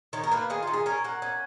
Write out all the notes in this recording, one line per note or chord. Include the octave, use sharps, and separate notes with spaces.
D#3 C#5
A#4
A#3 B4
D#3 G#4
F4
D#3
G#4
C#4 A#4
A#3 F#5
C#4